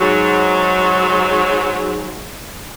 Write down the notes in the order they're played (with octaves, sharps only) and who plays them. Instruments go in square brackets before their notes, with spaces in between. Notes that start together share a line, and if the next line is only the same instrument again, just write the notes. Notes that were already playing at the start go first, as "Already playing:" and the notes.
[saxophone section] G#2 F#3